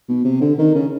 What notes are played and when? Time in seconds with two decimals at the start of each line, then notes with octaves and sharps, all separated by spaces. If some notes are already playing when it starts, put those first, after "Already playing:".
0.09 B2
0.25 C3
0.41 D3
0.58 D#3
0.75 C#3